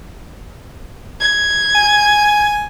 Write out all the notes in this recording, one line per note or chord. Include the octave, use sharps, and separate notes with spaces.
G#6
G#5